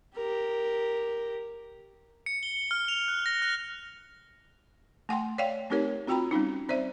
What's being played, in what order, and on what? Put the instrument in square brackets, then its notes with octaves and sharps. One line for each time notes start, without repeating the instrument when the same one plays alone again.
[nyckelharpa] G4 A#4
[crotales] C#7
G7
F6
F7
F#6
A#6
F#6
[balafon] A3 F#5 G5 C6
C#5 D5 F5 G5
A3 C4 D#4 G4 A#4 C#5
C4 F4 F#4 G5 A#5 B5
G3 C4 C#4 D#4
C4 C5 D5 E5